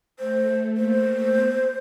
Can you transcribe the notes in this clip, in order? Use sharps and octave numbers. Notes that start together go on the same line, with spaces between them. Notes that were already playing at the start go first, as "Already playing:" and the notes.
A3 C5
A#3 C5
B3